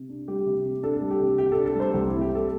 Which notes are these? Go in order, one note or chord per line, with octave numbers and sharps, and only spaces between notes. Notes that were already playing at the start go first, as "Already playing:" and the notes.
Already playing: C3
D4
G3 G4
C3
C3
D4 A4
G3
G4
C3
C3 G4
D4 A4
A4
G3 C5
C2 G4
C4 E4
G4
G3 A4